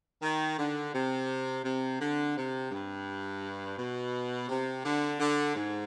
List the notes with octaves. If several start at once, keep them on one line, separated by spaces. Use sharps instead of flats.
D#3
D3
C3
C3
D3
C3
G2
B2
C3
D3
D3
G#2